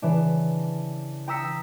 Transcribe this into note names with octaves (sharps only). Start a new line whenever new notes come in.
C#3 E3 D4
G5 A#5 D#6 E6 B6 C#7